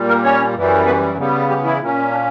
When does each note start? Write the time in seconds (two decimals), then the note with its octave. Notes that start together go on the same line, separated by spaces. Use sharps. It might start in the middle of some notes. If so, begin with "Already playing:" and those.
Already playing: A#2 G3
0.08 A#3 A#4
0.24 C#4 C#5
0.56 F#2 E3 G3
0.86 B3 B4
1.17 C#3 G3 B3
1.49 G3 G4
1.64 E3 E4
1.80 A#2 A#3 C#4
2.11 D4